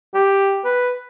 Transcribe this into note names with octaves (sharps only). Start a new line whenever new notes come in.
G4
B4